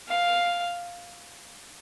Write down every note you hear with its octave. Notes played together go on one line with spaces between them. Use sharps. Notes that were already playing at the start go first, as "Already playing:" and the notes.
F5